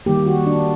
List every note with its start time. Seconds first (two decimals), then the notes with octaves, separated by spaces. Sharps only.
0.06 D#3 G3 A#3 G4
0.27 F#4
0.47 D4